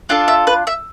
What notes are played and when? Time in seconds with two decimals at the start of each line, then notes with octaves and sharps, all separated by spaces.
0.09 D4 F4 A4
0.28 E5
0.47 B4
0.67 E5